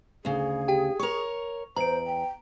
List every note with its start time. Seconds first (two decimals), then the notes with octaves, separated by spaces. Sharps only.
0.25 D2 C#3 G#4
0.68 G4 G5
1.00 A#4 C#5 C#6 F7
1.76 E2 C5 A#5 D7
2.07 G5